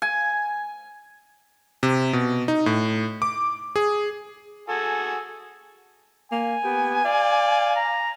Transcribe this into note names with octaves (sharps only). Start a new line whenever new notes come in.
G#5
C3
B2
D#4
A2
D6
G#4
F#4 G#4 A4 G#5
A#3 G#5
B3 G4
D5 F5
A#5